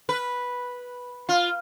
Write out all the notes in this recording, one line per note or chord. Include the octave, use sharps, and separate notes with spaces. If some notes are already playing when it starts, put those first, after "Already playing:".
B4
F4